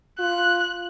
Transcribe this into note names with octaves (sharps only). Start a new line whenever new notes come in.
F4 F#6